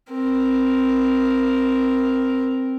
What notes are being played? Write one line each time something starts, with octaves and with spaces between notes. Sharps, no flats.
C4 A#4